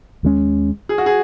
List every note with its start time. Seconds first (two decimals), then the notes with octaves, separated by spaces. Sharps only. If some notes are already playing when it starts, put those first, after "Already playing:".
0.23 D#2 D#3 G#3 C#4
0.89 G#4
0.98 F#4
1.06 G#4